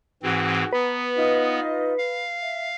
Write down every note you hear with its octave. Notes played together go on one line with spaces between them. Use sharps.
G#2 E3 C4 F#4 G#4
B3 B4 A#5
D#4 F4 D#5
F5
E5